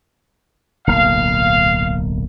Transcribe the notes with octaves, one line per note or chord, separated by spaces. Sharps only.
D1 B1 A#3 F5